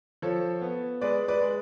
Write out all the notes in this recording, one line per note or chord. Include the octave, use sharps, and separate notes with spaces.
F3 A4 C#5
B3
G#3 B4 D5
B4 D5
G#3